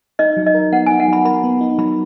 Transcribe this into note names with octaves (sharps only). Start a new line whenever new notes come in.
D#4 D#5
F#3
D#5
A#4
B3 F#5
D#4 G#5
F#5
F#3 B5
A#4 B5
B3
D#4
F#3 B5